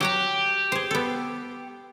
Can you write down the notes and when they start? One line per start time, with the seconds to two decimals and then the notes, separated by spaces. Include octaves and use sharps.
0.01 F#3 G4 F#5 A#5
0.72 G#4 C5
0.91 B3 A4